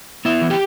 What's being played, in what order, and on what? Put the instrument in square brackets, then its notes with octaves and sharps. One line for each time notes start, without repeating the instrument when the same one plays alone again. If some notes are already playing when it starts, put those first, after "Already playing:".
[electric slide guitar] B3 E4 E5
E3
G4 G5